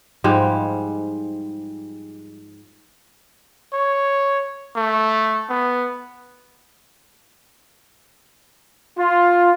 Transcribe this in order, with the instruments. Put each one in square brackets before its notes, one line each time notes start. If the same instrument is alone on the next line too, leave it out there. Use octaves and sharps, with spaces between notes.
[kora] G#2 F3 G3 G#3
[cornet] C#5
A3
B3
[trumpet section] F4